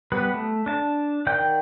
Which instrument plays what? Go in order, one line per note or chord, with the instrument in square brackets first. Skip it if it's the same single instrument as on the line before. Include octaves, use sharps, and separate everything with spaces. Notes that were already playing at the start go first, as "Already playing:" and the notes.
[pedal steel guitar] G3 B3 B4 B5
A3
D4 A5
D#3 D5 F#5 G5 G6